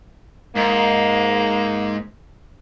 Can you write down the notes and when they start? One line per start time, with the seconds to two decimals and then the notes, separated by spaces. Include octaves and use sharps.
0.55 G#2 A#3